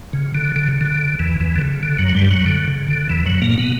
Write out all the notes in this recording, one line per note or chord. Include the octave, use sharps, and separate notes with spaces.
C#3
D3
D3
C#3
D3
E2 E3
E2 E3
D3
C#3
D3
F#2 F#3
G2 G3
F#2 F#3
D3
C#3
D3
E2 E3
F#2 F#3
A#2 A#3
B2 B3